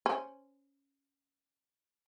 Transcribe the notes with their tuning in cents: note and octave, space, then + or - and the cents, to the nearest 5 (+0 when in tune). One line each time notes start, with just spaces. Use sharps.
C#4 +0 C5 +0